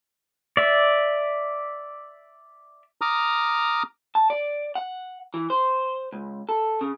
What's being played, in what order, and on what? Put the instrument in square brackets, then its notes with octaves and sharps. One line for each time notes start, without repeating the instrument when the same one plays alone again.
[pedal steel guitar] D5 E5
[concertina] A#5 D6 D#6 F6
[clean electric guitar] A5
D5
F#5
E3
C5
C#2
A4
C#3